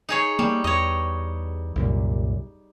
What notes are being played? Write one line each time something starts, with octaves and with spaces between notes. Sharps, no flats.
D#4 G#4 C#5
G3 A#3
E2 C#5 D#5
C2 F#2 A#2